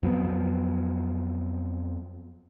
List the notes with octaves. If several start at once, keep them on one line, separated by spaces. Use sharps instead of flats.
F2 F#3 B3